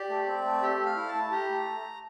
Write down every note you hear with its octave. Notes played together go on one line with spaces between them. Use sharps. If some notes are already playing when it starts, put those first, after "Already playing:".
Already playing: G4 D5
A3
C4
A3
G4 E5
A3
F5
E4
A5
A3
G4 A#5
A3